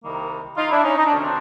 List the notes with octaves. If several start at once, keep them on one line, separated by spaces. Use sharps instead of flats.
C2 C3 D#3 G3 A#3
D#4 F4
D4 E4
C#4 D#4
D#4
D4
D2 C3 D#3 C#4
C4 D4